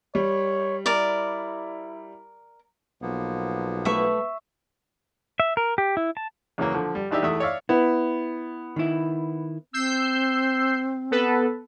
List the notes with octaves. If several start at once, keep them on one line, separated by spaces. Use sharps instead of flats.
G3 C#5
E4 A#4 D5
B1 F3 A#3 B3
A3 B4 E5 C#6
E5
A#4
G4
E4
A5
E2 C#3 E3 F#3 A#3
D3 F3
G3
A#1 E3 D4 D#4 G4 E5
E2 A3 E4 E5 D#6 E6
C#5 D5 E5 F5
B3 E4
D#3 E4
C4 E6 G6 C7
B3 A4 B4